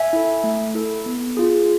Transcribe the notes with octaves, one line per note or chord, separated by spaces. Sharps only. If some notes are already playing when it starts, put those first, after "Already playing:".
Already playing: E5 G#5
E4 A4
A3
E4 A4
B3
F4 G#4